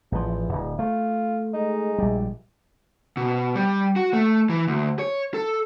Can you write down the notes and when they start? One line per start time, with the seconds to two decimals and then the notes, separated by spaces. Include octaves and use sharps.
0.12 A1 E2 F3
0.49 D1 A#1
0.79 A3 F4
1.53 G#3 D#4
1.98 A#1 G3
3.17 B2
3.56 G3
3.96 F#4
4.13 A3
4.50 E3
4.67 D2
4.99 C#5
5.34 A4